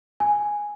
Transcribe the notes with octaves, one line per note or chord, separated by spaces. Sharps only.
G#5